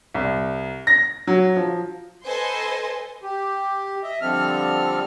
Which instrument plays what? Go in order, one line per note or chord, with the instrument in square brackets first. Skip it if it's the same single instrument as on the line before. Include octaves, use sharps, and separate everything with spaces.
[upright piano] C2
A#6
F#3
F3
[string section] A4 B4 C5 D#5 G#5 C6
[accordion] G4
D#5 E5
D3 F3 G3 C4 A4 F6